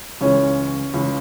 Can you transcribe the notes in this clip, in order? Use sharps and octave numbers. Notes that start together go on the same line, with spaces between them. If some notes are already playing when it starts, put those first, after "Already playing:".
C#2 C#3 E3 C#4
C#2 C#3 E3